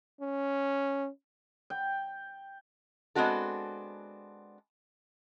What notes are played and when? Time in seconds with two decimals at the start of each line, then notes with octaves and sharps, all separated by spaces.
0.21 C#4
1.70 G5
3.15 G#3 B3 C4 D4 F#4 A4